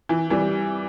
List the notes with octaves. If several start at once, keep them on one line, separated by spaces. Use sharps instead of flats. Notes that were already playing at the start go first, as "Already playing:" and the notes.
E3
E3 G3